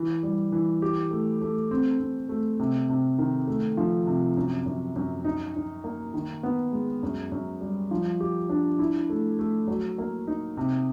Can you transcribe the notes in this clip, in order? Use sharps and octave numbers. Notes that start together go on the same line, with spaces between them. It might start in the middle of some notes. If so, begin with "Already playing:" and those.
Already playing: E3
G3
E3
G4
A3
A3
C4
C4
A3
C3
C3
D#3
A3
F3
C3
F#2
F#2
F#2
D#4
D#4
A#3
D#3
B3
G#3
F#2
F#2
G3
F3
G4
D4
E4
A3
A3
F#3
A#3
D#4
C3